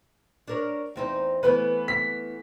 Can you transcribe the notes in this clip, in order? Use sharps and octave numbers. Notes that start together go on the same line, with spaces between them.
D4 A#4 C#5
E2 C4 D#4
E3 A3 B3 B4
B6